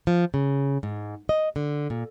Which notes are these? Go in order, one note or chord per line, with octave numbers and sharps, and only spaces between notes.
F3
C#3
G#2
D#5
D3
A#2